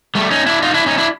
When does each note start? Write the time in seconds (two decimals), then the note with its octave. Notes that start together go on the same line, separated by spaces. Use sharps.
0.15 G3 A3
0.31 C#4 D#4
0.46 D4 E4
0.62 D#4 F4
0.74 D4 E4
0.86 C#4 D#4
0.98 D4 E4